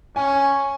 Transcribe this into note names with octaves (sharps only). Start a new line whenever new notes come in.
C#4 G#5